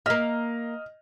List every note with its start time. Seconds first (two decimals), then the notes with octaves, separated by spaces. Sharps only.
0.06 A#3 D#5 E5 F6